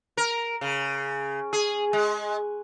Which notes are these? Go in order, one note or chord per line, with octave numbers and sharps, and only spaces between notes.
A#4
C#3
G#4
G#3